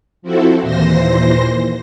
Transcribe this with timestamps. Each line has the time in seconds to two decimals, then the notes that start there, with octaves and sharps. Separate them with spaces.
0.22 F3 C4 E4 F#4 A4
0.62 D#2 A#2 E3 C5 C6 A#6